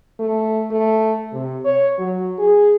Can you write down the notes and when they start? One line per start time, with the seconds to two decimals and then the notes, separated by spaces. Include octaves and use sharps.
0.20 A3
0.71 A3
1.33 C3
1.65 C#5
1.99 F#3
2.39 G#4